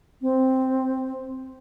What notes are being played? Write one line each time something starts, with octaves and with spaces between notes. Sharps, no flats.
C4